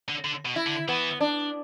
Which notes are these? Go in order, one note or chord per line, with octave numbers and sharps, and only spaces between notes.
D3
D3
B2
E4
D3
E3 B3
D4